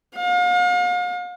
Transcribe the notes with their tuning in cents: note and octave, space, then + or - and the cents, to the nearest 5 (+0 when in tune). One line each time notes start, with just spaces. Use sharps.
F5 +40